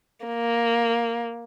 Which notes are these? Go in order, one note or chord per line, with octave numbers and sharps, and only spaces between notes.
A#3